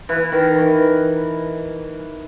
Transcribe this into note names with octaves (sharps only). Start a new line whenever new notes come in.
E3
D#3
E3